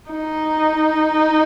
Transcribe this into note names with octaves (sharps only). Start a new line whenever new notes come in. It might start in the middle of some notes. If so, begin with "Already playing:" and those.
D#4